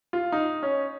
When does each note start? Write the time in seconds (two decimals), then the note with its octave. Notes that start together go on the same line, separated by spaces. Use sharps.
0.13 F4
0.32 D#4
0.63 C#4